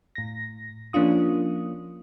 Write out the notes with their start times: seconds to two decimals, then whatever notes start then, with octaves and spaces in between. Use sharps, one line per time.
0.15 A2 A#6
0.93 F3 A#3 C#4 D4 F4 D#6